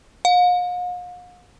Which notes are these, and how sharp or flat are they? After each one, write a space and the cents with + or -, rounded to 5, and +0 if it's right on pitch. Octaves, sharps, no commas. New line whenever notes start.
F5 +45